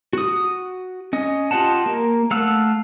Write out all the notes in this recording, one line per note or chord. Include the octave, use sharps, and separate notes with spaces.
F#4 D#6
C#4 D#5
F4 G4 D#5 F#5 A5
A#3
A3 F5 F#5 E6